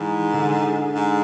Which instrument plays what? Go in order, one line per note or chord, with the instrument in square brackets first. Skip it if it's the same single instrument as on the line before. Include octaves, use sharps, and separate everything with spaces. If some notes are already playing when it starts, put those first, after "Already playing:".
Already playing: [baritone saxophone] G#2 [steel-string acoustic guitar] E3
[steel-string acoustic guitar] D3
[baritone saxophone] G#2